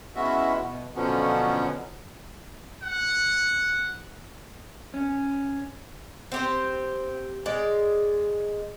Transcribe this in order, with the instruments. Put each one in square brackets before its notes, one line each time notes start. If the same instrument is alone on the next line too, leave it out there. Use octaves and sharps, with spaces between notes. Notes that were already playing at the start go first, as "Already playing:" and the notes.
[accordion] G#3 B3 C#4 E4 F#4 E5
B2
B2 D3 F3 F#3 B3 C#4
[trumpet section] F#5
[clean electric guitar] C#4
[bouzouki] C4 G4 C5
G#3 D5